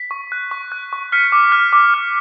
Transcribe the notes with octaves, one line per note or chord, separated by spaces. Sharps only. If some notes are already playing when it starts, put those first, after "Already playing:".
Already playing: B6
C#6
F#6
C#6
F#6
C#6
F6 B6 C#7
D6
F6
D6
F6